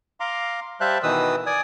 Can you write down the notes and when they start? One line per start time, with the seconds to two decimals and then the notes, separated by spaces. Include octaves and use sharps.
0.20 F5 A#5 C6 D6
0.81 G3 C5 E5 F5 A5 F#6
1.03 B2 D#3 E3 B4 D#6 E6
1.46 D5 G#5 D#6